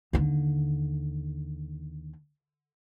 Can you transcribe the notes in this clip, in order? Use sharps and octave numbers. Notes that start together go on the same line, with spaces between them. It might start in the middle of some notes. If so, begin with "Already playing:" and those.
D#2 D3